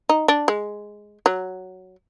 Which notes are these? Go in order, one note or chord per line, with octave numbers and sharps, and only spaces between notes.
D#4
D4
G#3
F#3